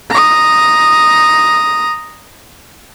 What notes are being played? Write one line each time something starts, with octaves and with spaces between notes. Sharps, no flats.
A#5 D#6